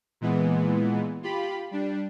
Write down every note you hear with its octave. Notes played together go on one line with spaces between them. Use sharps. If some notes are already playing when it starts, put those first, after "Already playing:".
A#2 E3 G#3 B3
F4 G4 B5
G3 D4